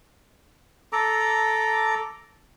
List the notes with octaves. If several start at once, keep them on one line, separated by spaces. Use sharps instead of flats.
A4 A#5 D6